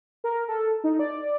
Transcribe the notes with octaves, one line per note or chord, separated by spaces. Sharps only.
A#4
A4
D#4
D5